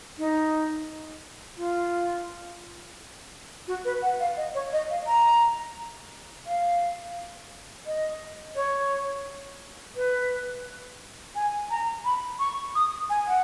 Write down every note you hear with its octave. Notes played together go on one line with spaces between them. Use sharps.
D#4
F4
F#4
B4
F#5
F5
D#5
C#5
D#5
F5
A#5
F5
D#5
C#5
B4
G#5
A#5
B5
C#6
D#6
G#5
F#5